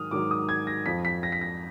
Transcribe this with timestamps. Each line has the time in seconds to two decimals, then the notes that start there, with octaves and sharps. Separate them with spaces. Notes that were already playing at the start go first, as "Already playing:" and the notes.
Already playing: G#2 D#3 F#3 D#6 F6
0.11 G#2 D#3 F#3 D6
0.31 D#6
0.49 G#6
0.67 A#6
0.86 F2 F3 B6
1.05 B6
1.23 A#6
1.32 B6
1.41 A#6